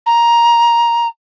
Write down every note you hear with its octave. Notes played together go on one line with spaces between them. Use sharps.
A#5